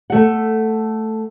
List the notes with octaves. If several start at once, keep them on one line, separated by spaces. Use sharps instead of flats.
A3 F#5